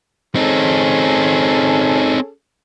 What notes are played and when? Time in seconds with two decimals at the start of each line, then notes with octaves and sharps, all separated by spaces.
0.35 C4 C#4 D#4 G#4 A4